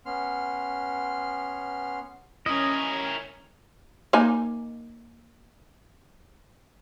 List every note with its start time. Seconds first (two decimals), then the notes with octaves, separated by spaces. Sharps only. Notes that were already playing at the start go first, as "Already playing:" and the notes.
0.06 B3 C#4 C6 F6
2.46 C#4 E4 A#4 D#5 G#6
4.13 A#3 D#4 G#5